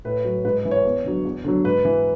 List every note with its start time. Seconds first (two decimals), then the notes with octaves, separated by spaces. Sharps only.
0.05 A2 B4
0.25 F#3
0.45 G#2 B4
0.58 B4
0.65 E3
0.71 C#5
0.85 E2
1.05 D3 F#3
1.25 E2
1.44 D3 F#3
1.64 G#2 B4
1.85 E3